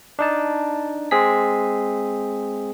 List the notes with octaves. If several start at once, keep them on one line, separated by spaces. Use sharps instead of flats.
D4 D#4 A5
G#3 C4 G#4 B6